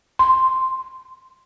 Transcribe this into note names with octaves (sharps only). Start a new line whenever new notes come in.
C6